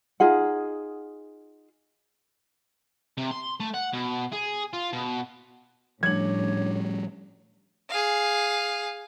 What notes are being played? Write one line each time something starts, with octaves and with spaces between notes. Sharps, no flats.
D#4 F4 G#4 F#5
C3
C6
A3
F#5
B2
G#4
F4
B2
A2 F3 G3 C#4 D4 C#5 G#6
G#4 F5